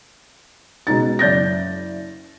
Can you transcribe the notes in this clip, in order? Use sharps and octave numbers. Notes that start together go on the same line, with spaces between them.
B2 G#3 D#4 A6
F#1 D5 G6 A6 A#6